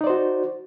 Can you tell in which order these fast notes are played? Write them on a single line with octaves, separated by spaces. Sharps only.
D#4 D5 C5 F#4